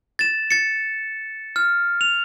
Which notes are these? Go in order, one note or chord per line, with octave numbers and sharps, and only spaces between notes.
A6 E7
A6 C#7
F6
F7